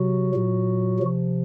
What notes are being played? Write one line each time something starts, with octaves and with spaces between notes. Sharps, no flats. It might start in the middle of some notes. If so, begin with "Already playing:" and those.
Already playing: C3 F#3 F#4
A#2 F#3
C3 F3